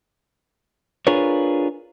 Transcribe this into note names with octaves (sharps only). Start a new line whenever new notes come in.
D4 F4 G#4 A#4 B4 C#5